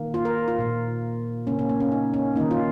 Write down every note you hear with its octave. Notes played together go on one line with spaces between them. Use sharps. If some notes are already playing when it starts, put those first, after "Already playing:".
Already playing: D#3 A#3
F4
A#4
F4
A#2 A#3
C#3 A#3 C#4
C#4
A#3
C#4
D#4
C#4
D#3 A#3 D#4
F4